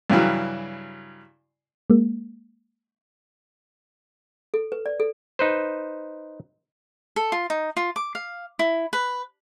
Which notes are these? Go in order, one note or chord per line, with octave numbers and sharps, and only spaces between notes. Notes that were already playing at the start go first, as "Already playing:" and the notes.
G2 C#3 E3 F#3
G#3 A#3
A4
B4
D5
A4
D#4 B4 C5
A4
F4
D#4
F4
D6
F5
E4
B4